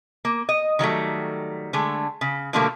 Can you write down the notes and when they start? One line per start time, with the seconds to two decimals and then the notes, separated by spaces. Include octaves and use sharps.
0.25 A#3
0.49 D#5
0.79 D#3 F#3 G3 A3
1.73 D3 G#3 A3
2.21 C#3
2.53 B2 D3 F3 G3 A3 A#3